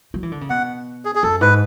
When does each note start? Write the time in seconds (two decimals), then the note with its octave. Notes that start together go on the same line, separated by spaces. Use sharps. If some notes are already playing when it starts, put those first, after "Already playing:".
0.14 F#3
0.23 E3
0.32 D3
0.41 C#3
0.50 B2 F#5
1.05 G#4
1.15 G#4
1.23 F#2 A4
1.41 G#2 B4